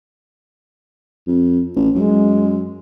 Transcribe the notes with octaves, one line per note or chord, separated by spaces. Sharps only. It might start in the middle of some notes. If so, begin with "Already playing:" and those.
F2
A1
F#2 G#3